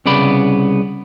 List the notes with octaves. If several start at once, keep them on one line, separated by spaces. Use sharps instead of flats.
C2 C#3 B3 D5 B5